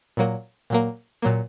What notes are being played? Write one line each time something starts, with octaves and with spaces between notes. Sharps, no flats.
A#2 F#3 A#3
A#2 F#3 A#3
A#2 F#3 A#3